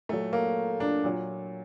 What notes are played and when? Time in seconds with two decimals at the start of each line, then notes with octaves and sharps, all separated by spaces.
0.09 A#2 F#3 A3
0.33 A#3
0.80 D4
1.04 A#2 F#3